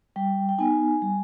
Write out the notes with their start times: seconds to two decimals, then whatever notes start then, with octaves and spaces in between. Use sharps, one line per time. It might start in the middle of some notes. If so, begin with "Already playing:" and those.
0.16 G3 G5
0.49 G5
0.59 B3 D#4 G#5
1.02 G3